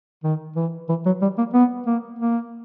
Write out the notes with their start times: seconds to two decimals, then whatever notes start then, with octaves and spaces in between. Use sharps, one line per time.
0.24 D#3
0.56 E3
0.89 E3
1.06 F#3
1.22 G3
1.38 A#3
1.54 B3
1.87 A#3
2.19 A#3